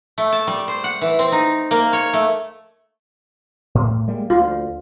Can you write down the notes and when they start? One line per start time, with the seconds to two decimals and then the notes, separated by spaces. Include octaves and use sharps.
0.18 A3
0.32 A5
0.47 G3
0.68 C5
0.84 F#5
1.01 E3
1.19 C4
1.32 D#4
1.71 A#3
1.93 C#5
2.13 A3
3.75 A2
4.08 G3 G#3 A#3
4.30 D2 F4